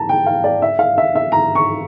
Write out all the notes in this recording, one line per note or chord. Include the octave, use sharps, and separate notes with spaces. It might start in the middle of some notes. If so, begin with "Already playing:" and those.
Already playing: A5 A#5
G5
F5
D5
E5
F5
E5
E5
A#5
C#6